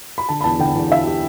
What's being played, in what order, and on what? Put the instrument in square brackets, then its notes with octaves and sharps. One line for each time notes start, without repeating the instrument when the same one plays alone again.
[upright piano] B5
D3 A5
B5
E2 A5
D3 G5
E2
D3 E5
G4